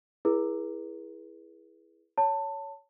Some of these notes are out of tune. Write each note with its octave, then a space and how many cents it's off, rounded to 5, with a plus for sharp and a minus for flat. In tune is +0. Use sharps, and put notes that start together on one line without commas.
E4 +0 G#4 +0 B4 -40
C#5 +15 A5 +20